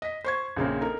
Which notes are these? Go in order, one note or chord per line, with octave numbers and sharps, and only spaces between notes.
D#5 B6
C5 C#6 G#6
A#1 C#3 A#3 C4
D#4 A4 A#4